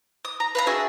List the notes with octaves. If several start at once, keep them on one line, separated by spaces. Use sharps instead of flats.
D#6
A#5
B4 F5 A#5
D4 F#4 G#4 E5